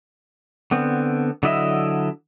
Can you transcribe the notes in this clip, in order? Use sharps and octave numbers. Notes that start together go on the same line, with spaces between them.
D3 B3 C4
D3 F#3 E4 D#5 E5